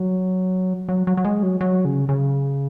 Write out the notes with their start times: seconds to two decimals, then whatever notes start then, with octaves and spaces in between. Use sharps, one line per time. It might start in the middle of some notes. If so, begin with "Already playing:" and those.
Already playing: F#3
0.89 F#3
1.07 F#3
1.17 F#3
1.24 G#3
1.43 F#3
1.61 F#3
1.85 C#3
2.09 C#3